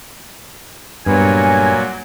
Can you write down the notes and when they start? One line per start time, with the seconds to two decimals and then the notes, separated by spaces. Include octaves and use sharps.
1.06 G2 A#2 F#3 B3 A#4 C#5 G#5